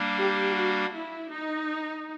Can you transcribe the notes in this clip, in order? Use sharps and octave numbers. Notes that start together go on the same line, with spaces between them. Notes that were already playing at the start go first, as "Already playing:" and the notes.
Already playing: G3 A#3 D4
G4
F#4
E4
D#4